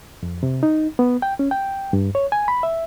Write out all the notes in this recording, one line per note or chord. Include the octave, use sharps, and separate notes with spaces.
F2
C3
D#4
B3
G5
C#4
G5
G2
C#5
G#5
B5
E5